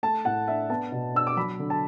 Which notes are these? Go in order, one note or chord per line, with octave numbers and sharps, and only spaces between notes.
A3 A5
A2 F#5
D4 E5
B3 A5
B2
D4 E6
D6
F#3 B5
D3
A5